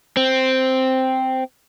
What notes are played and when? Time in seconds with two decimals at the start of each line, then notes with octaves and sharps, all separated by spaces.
0.17 C4